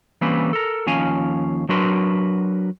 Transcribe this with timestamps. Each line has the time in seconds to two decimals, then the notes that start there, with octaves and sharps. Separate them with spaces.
0.21 E3 G3 A#3 C4 C#4 B4
0.53 A4 A#4
0.87 D#2 F3 C#4 F5 G#5
1.69 F#3 D4 F#4 A#4 B4 C6